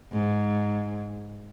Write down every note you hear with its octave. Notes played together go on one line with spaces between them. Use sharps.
G#2